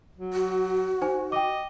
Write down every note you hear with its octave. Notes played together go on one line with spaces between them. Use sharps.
F#3
F#4
D#4 C5 G#5
D#5 G5 D6